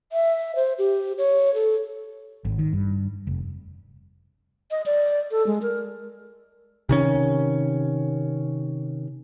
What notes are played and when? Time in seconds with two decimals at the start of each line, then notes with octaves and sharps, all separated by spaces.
0.12 E5
0.55 C5
0.78 G4
1.18 C#5
1.54 A4
2.45 G#1
2.59 D#3
2.73 G2
3.27 F1
4.71 D#5
4.86 D5
5.31 A4
5.47 G#3
5.62 A#4
6.89 C3 D#3 C#4